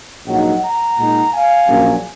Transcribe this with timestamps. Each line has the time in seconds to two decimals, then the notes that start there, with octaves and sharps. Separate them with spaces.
0.26 A#1 G#2 F#3 A#3 D#4 D#5 F#5
0.62 F#5 A#5
0.98 A#2 G#3 D#4
1.32 F5 G#5
1.67 A#1 A#2 F#3 C#4